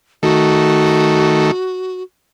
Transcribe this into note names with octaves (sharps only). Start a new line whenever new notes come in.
D#3 A3 F#4